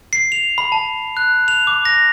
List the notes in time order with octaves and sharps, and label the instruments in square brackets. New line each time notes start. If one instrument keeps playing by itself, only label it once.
[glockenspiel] C7
F7
B5
A5
F#6
F7
D6
A#6